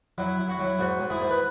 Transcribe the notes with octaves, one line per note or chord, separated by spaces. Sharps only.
F#3 E4
E4
F#4
F#3
E4
G#2 F#4
G#2
E4 G#4
G#2
B4